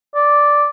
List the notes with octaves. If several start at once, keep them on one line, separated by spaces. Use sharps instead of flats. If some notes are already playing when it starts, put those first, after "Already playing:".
D5